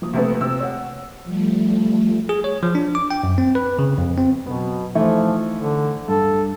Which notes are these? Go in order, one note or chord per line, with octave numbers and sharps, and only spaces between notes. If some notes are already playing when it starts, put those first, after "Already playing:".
F3 A#3 D#6
C3 A3 B3
C3 E6
C#5 F#5
F3 G3 A3
G#4
C#5
F3
D4
D6
G5
F#2
C4
B4
C#3
F2
C4
B2 F#3 B3
E3 F3 A3 D#4
D3
G2 A4